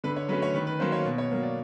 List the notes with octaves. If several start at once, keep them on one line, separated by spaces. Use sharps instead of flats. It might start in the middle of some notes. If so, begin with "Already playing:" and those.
D3 B4
C#5
F#3 A3 C#4 B4
C#5
D#3 B4
B4
F#3 A#3 C#4 C5
C#5
B2
C#5
F#3 A#3
D5